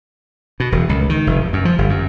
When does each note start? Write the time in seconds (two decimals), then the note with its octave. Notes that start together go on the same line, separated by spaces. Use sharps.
0.60 B2
0.72 E1
0.89 C#2
1.09 D#3
1.27 F1
1.40 F2
1.53 F#2
1.65 F3
1.78 G1
1.90 F#2